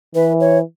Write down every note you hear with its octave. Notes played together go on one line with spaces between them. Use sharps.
E3 B4
C#5